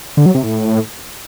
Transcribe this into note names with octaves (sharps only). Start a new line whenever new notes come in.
D3
F#3
C3
A2